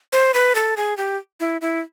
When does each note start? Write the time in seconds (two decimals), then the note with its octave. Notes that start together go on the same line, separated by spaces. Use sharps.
0.13 C5
0.34 B4
0.55 A4
0.77 G#4
0.97 G4
1.40 E4
1.61 E4